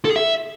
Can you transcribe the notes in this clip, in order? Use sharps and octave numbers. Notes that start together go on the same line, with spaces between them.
A4
G#4
E5